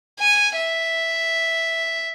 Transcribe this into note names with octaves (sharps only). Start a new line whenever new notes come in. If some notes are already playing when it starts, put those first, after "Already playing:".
G#5
E5